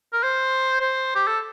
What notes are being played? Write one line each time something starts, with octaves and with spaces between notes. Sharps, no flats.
A#4
C5
C5
G4
A4